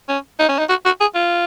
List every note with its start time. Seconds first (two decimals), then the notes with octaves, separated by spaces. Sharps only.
0.09 C#4
0.39 D#4
0.49 C#4
0.59 D#4
0.70 F#4
0.86 F#4
1.01 G#4
1.15 F4